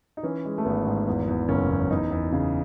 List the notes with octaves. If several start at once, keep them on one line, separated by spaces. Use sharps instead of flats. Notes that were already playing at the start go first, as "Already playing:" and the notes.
D#4
E3 C#4
G#3
A3
G#1 B3
G#2
E2
E2
F#1 C#4
E2
E2 D#4
E2
C#3